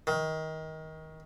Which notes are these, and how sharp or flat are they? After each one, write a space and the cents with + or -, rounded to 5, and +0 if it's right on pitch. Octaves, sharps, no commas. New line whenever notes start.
D#3 +25